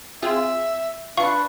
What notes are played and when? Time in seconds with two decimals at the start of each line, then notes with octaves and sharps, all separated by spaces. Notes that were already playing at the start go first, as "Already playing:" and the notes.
0.22 C4 F4 G#4 E5
1.17 D4 F4 B4 F5 C#6 C#7